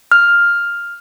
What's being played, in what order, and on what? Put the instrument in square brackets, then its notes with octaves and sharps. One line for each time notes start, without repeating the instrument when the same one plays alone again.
[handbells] F6